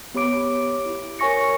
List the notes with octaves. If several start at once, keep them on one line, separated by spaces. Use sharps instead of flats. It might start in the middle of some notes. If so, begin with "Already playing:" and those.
B3 G4 C#5 B5 D6 D7
E4 G4
A#4 C#5 G#5 C#6 A#6 C#7